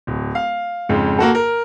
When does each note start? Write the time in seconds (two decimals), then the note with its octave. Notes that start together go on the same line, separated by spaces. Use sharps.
0.07 D1
0.35 F5
0.89 F2 G#2 C#3
1.19 A#3 F#4 A4
1.35 A#4